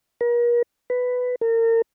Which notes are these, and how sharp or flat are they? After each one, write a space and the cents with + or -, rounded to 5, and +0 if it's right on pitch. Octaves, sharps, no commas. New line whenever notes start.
A#4 +40
B4 +10
A#4 -35